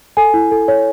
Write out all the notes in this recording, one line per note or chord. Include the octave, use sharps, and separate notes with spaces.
A4 G#5
E4
A4
C#5